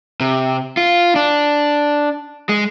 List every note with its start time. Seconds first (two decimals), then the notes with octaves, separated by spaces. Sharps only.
0.20 C3
0.77 F4
1.16 D4
2.49 G#3